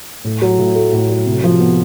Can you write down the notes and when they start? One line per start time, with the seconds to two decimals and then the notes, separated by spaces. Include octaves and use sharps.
0.25 A2
0.42 F#3
0.59 A2
0.75 A3
0.93 A2
1.09 F#3
1.26 C3
1.44 F3
1.60 B3